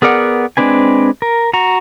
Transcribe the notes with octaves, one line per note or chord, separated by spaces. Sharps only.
B3 G#4 A#4 D5 F#5
G#3 C4 D4 B4 G#5
A#4
F#4 A#5